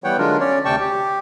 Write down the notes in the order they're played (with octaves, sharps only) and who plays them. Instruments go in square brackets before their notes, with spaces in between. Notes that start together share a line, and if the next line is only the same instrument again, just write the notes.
[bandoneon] E3 G3 B3 C#5 F#5 G5
D3 F#3 G#3 D4 F4 A#4
C#4 C#5 D5
D2 C3 D5 G5 A5 C#6
G4